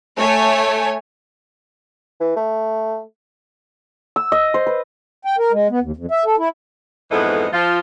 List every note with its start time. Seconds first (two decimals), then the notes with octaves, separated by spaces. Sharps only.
0.17 A3 C#5 G#5
2.20 E3
2.36 A3
4.16 E6
4.32 D#5
4.54 C5
4.67 B4
5.25 G5
5.38 A#4
5.52 G#3
5.71 B3
5.82 D#2
5.97 F2
6.11 E5
6.25 A4
6.39 E4
7.11 F2 G#2 E3 B3 A4 D#5
7.52 F3 F4